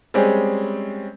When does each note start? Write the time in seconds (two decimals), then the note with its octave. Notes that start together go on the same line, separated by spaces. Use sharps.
0.14 G3 G#3 C4 C#4 G#4